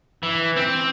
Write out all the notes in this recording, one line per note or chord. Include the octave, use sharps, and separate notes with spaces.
E3
C4